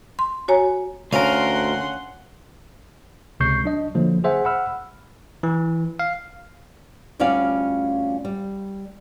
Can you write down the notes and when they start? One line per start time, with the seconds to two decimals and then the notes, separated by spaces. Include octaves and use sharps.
0.19 C6
0.48 F#4 C#5 G#5 A#5
1.13 D2 C#4 A#4 F5 F#5 C6
3.40 C#2 C3 C#6 G6 C7
3.64 F#3 D4 D#5
3.95 D3 F3 F#3 A#3
4.24 G#4 C5 E5 F#5 G#5
4.45 F#5 B5 E6 F6
5.43 E3
6.00 F5
7.20 D2 G3 C#4 F4 D5 F5
8.25 G3